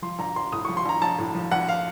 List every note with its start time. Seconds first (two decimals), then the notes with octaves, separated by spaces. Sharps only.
0.02 F3 C6
0.19 A#1 A#5
0.36 A#1 C6
0.52 A2 D#6
0.65 F3 C#6
0.77 C6
0.85 A#1 A#5
1.02 A#1 A5
1.18 A2
1.35 F3
1.51 A#1 F#5
1.68 F5